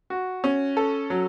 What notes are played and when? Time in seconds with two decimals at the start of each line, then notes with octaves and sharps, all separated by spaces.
0.10 F#4
0.44 C#4
0.77 A4
1.10 F#3